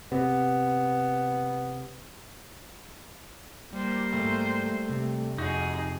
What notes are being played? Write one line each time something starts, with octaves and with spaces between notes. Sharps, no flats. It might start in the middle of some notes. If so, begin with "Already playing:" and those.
C3 B3
G3 A#3 C5
E2 G#2 A3
C3
F2 D#4 F#4 G#4